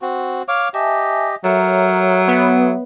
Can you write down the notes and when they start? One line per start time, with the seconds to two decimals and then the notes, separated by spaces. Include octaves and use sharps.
0.02 C4 F#4
0.48 C#5 F5 D6
0.74 G4 D#5 E5 G#5 A5
1.44 F#3 A4 A#4 C#5 E5
2.28 B3